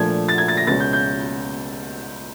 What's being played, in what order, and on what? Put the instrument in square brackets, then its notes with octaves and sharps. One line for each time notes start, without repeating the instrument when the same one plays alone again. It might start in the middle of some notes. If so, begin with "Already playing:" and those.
Already playing: [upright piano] A#2 F3 A3 D4 G#6
A6
G#6
A6
A#6
C#2 B2 G#3 C#4 A6
G6
G6